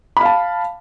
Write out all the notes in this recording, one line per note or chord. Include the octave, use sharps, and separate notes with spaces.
F5 A5 B5